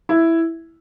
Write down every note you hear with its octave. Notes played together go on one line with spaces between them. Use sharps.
E4